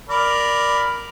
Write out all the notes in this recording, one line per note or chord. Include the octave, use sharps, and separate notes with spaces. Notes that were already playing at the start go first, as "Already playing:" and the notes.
A#4 D5 B5